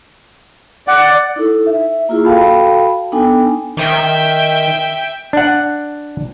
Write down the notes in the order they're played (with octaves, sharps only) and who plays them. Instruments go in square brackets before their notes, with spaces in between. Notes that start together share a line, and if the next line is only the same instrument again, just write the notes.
[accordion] D5 [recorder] F#5
[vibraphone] D#4 E4 A4
E5
A#3 E4 F4 G#4
F#4 A4 F5 G5 A5 B5
B3 D4 D#4 A4 G5 G#5
[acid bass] D#3 [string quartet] E5 G5
[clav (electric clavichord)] D4 F#5